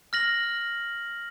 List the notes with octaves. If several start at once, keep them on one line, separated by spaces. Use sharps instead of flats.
F6 A#6 F#7